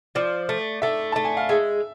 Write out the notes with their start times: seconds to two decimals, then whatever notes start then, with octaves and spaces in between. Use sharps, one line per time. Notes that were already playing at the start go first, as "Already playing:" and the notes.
0.15 F3 D5
0.49 A3
0.82 A3 E5
1.12 A3 A5
1.25 G#5
1.37 F5
1.49 G#3 E5